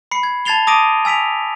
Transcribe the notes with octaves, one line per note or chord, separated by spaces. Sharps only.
B5 C7 C#7
G#6
A5 G#6 A6 C7 F7 G7
A5 D6 D#6 A#6 D7 D#7
G#5 E6 B6 D7 F7